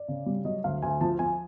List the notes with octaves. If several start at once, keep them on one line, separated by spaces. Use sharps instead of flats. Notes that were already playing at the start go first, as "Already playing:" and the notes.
Already playing: D5
C#3
G3
F#3 D#5
D2 F5
D2 G#5
F3 A5
F3 G#5